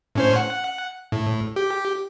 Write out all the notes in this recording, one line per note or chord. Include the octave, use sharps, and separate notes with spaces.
A2 C#4 C5
F#5
A2
G4